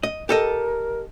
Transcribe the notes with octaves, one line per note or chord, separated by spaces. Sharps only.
D#5
G4 A4 A#4 D#5